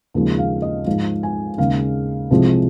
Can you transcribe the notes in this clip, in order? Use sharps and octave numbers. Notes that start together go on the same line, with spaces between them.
D#2 C#3 F3 G#3
F5
D#5
G#2 F3 G#3 F5
G#5
D#2 C#3 G#3 F5
C2 C3 F3 G#3